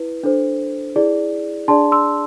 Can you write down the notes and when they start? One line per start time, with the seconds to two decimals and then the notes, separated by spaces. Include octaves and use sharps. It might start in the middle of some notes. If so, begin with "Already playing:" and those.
Already playing: E4 B4
0.23 D4 A4 C5
0.96 E4 G#4 D5
1.68 D4 G#4 D5 A5 C6
1.92 C6 E6